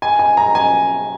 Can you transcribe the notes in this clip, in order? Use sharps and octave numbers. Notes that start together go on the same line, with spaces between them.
G#5
G#5
A#5
G#5